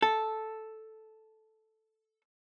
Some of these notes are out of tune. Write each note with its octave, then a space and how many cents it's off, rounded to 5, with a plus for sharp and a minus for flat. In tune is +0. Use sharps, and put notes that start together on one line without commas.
A4 -5